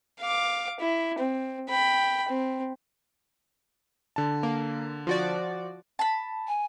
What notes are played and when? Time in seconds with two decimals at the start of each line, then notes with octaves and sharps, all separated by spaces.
0.20 F5 D6
0.80 E4
1.19 C4
1.70 G5 B5
2.29 C4
4.16 D3 A5
4.43 A#3
5.07 F3 F#4 D5
5.99 A5 B5
6.48 G#5